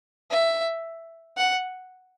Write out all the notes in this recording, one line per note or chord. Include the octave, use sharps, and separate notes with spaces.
E5
F#5